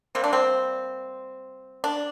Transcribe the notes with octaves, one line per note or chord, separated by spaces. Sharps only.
C3 G3 A#3 C4
D4
C4
D4